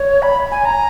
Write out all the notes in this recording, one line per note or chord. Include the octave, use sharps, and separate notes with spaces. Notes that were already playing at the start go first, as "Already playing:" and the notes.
Already playing: C#5
B5
G#5
A#5